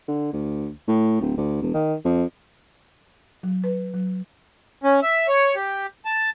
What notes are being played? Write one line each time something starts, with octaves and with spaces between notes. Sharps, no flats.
D3
D2
A2
D1
D2
E1
D#3
F2
F#3
B4
F#3
C#4
E5
C#5
G4
A5